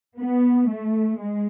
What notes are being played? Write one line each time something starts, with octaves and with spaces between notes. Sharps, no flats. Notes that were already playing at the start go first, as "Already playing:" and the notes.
B3
A3
G#3